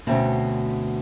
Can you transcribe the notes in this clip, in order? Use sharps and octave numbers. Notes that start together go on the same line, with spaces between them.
D2 B2 C4 C#4